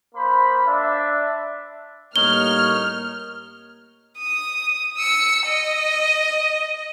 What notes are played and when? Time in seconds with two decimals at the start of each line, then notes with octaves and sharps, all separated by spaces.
0.15 A#3 C5 B5
0.66 D4 E5
2.16 A2 G3 A#3 D#4 C#5 F6 G7
4.18 D#6
4.98 E6 C#7
5.46 D#5